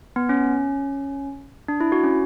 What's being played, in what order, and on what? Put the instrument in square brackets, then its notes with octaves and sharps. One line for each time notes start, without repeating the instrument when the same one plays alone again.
[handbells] B3
C#4
D4
E4
F#4
C#4